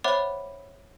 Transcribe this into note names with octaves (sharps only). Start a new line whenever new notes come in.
C5 C#5 E5 F#5 B5 D6